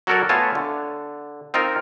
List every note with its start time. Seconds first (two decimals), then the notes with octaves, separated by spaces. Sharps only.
0.07 F#3 F#4 A4 A#4 C#5 D5
0.29 A3 B3 F4 C#5 G#5 A5
0.55 D3
1.54 C4 D#4 F4 A#4